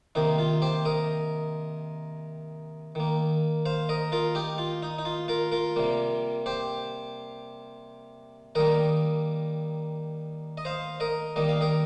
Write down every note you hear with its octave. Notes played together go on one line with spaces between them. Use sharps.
C3 D#3 A#3 D#4
F4
G4 C5
A#4 D#5
D#3 A#3
C5 F5
A#4 D#5
F4 A#4
D#4 G4
F4
D#4
D#4
F4
F4 A#4
F4 A#4
C3 G3 A#3
G4 C5
D#3 G3 A#3 A#4 D#5
D#5
C5 F5
A#4 D#5
D#3 G3 A#3 D#5
F5
A#4 D#5